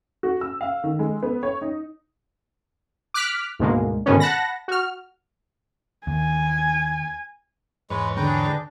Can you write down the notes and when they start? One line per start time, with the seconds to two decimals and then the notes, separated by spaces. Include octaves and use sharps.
0.23 F#4
0.41 E6
0.61 F5
0.84 D#3
0.99 G#3
1.23 B3
1.43 C#5
1.62 D#4
3.14 D6 F6 F#6 B6
3.59 D2 G#2 B2 D3 G#3 A#3
4.06 G#2 B2 D3 D#3 B3 C#4
4.20 F#5 A5 B5 A#6
4.68 F#4 F6
6.07 D#2 G#5
7.90 E2 G#2 G#3 B4 C#5
8.17 D3 D4 G#4 B4 G5 A#5